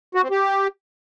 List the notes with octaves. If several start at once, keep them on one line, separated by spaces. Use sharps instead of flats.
F#4
C4
G4